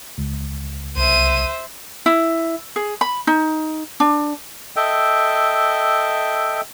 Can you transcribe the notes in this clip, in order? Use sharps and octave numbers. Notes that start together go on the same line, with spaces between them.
C#2
C2 C5 E5 D#7
E4
G#4
B5
D#4
D4
A4 D#5 E5 G5